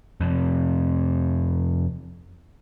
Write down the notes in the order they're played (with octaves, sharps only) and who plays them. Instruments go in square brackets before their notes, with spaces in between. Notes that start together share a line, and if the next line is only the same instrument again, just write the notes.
[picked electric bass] F2 C3